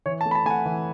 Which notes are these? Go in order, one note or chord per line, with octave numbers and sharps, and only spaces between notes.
E3 C#5
A5
A3
B5
A5
A3 F#5 G#5
E3